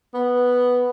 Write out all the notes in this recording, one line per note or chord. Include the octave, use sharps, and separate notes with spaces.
B3